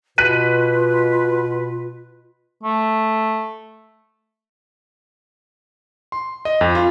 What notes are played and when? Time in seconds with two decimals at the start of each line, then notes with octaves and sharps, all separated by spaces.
0.18 B2 F4 B4 F#6 B6 D#7
2.63 A3
6.12 C6
6.45 D#5
6.61 F2
6.75 F4